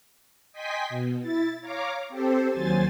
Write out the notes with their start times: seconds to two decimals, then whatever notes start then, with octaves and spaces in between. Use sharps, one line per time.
0.53 D#5 G5 G#5 C6 B6
0.89 B2
1.21 E4 A6
1.61 C#5 F5 A#5 D6
2.08 C4 G4 A4 C5
2.50 D#2 F#3 C5 G#5 A6